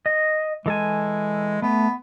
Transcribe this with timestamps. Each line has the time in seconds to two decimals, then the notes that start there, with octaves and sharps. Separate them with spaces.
0.06 D#5
0.66 E3 G#3 A4 G#5
1.62 A3 B3